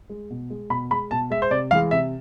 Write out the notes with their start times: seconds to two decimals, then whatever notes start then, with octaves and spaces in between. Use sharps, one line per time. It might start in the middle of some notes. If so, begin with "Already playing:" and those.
0.10 G#3
0.30 B2
0.50 G#3
0.70 B2 B5
0.91 G#3 B5
1.11 B2 A5
1.30 G#3 E5
1.42 C5
1.51 C3 D5
1.71 E3 G#3 F5
1.91 C3 E5